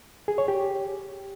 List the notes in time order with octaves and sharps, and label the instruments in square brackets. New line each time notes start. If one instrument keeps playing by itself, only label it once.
[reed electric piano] G#4
C#5
G4